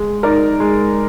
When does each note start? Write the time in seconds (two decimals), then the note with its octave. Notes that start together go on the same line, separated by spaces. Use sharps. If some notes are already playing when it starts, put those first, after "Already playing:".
Already playing: G#3
0.23 D#4 A#4 D5
0.60 G#3